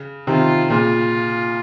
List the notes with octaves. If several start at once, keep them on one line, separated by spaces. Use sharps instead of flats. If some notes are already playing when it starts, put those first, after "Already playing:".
Already playing: C#3
C3 D#3 F4
A#2 C#3 F4